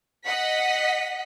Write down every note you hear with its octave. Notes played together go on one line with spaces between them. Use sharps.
D#5 F#5 B6